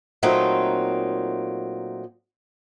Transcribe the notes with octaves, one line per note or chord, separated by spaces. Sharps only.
A#2 F#3 A3 C4 D#4